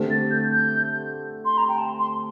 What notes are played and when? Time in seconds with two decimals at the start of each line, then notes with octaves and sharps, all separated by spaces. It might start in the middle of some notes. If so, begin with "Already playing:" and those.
Already playing: D3 A3 C4 G4
0.10 A6
0.30 G6
0.51 G6
1.45 C6
1.57 A#5
1.68 G5
1.78 A5
1.99 C6